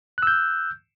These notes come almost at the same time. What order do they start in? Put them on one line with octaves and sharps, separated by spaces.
F#6 E6 G6